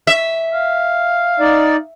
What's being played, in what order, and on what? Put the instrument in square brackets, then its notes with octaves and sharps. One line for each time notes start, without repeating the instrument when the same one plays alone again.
[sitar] E5
[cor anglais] F5
[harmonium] D#4 D5